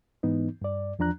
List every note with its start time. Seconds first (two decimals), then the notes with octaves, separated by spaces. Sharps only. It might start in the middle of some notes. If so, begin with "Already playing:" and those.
0.23 G#2 E3 B3 D#4
0.62 G2 D5
0.99 E2 F3 D4 A#5 F#6